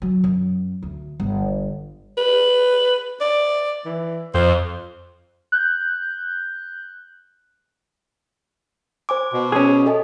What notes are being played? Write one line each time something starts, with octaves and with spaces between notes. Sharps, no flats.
F#3
F#2
D2
G1
B4
D5
E3
F2 C5
F#6 G6
C5 G#5 D6
B2
C#4 G#4
A4 D#5 G#5